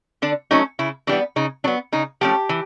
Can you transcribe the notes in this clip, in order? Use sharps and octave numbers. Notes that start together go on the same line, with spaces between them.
D3 D4
F#3 A3 C#4 D#4
C#3 E4
E3 G3 B3 D4
C#3 D#4
F#3 B3 D4
C#3 D#4
F3 A3 C#4 G4
E3